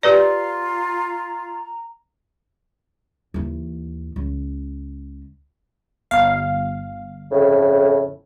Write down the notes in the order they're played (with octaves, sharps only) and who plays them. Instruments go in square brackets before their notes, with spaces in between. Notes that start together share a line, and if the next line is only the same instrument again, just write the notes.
[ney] F4 [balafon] G4 B4 D5 [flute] A#5
[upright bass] D#2 E3
C#2
[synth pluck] G1 F5
[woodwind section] F2 A2 C#3